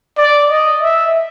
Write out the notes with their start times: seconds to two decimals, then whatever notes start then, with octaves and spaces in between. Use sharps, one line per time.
0.18 D5
0.50 D#5
0.81 E5